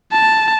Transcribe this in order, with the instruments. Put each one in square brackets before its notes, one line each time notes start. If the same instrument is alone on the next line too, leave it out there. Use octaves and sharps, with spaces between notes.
[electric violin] A5